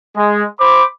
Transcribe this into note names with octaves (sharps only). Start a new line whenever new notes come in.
G#3
C5 B5 D6